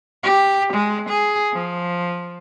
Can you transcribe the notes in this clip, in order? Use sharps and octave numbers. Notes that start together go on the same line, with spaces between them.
G4
G#3
G#4
F3